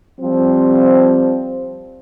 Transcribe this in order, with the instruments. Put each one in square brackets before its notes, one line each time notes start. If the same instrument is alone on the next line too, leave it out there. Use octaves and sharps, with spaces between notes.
[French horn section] F3 G3 C4